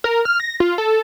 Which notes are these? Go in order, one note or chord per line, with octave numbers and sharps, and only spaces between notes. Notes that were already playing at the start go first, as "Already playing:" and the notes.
A#4
F6
A#6
F4
A4